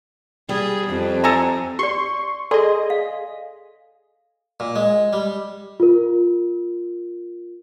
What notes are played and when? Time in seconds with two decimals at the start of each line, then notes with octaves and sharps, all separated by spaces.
0.49 G3 G#4
0.88 F2
1.24 A4 G#5 A#5
1.79 G4 D5 C6 C#6
2.51 G#4 A4 D5 D#5 C6
2.90 F5
4.60 A#2
4.75 G#3
5.13 G3
5.80 F4 A#4